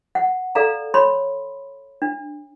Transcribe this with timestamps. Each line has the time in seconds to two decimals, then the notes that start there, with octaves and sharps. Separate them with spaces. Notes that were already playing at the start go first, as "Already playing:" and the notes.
0.15 F#5
0.55 A4 D5 F5 A#5
0.94 C#5 B5 C6
2.02 D4